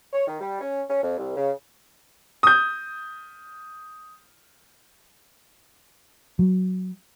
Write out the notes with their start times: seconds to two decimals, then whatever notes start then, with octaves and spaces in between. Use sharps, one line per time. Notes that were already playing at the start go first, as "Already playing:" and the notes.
0.13 C#5
0.27 D#3
0.40 G3
0.61 C#4
0.89 C#4
1.03 F2
1.18 C2
1.37 C#3
2.43 D#6 G6
6.39 F#3